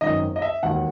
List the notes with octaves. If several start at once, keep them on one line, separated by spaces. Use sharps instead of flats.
G#1 F#2 D#3 D#5
D#5
E5
E1 D#2 D#3 F#5